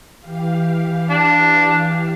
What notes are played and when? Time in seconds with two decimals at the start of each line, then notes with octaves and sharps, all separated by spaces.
0.21 E3 G4 F5
1.10 D4